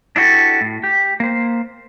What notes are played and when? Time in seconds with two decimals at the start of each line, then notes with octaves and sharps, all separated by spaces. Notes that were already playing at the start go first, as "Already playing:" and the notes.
0.16 D4 E4 F#4 G4 A4
0.61 A2
0.83 G4
1.20 A#3 C5